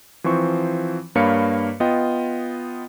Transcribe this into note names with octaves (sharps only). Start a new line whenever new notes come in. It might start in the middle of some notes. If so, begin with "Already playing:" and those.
E3 F3 C4 C5 C#6
G2 A#3 C#5 F5 B5 C#7
B3 F4 D#5 G5